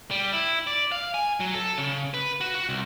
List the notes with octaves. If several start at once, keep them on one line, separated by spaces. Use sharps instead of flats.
G3
E4
D5
F5
G#5
F#3
A4
C#3
B4
F#4
F#4
C2